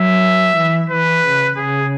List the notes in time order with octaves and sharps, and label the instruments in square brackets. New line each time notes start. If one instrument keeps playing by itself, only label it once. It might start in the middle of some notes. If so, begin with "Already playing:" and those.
Already playing: [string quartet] F#3 [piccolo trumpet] E5
[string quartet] E3
[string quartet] E3 [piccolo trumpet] B4
[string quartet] C#3
[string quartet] C#3 [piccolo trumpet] G#4